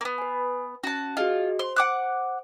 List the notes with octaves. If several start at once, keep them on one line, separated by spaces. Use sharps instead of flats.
A#3 B3
B4 G#5
C#4 F#4 A5
F4 F#4 G#4 D#5
C5 C6
F#5 D6 F#6